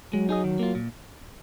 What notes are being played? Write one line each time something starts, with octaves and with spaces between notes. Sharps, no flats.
F#3 G#3
D#4 G#4 D#5
D#3
A#3 F4
A#2